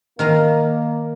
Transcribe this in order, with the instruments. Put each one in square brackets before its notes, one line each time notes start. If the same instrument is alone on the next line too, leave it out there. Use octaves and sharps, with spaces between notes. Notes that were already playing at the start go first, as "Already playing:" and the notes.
[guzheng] D#3 F5 A#5 [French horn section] A#3